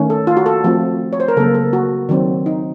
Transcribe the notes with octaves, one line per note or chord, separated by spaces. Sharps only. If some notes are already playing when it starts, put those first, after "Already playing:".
Already playing: D#3 A3 C#4
A4
F4
F#4
A4
F3 A3 C4
C#5
C5
A#4
C#3 F#3 A#3 A4
A4
F#4
D#3 F#3 C4
D#4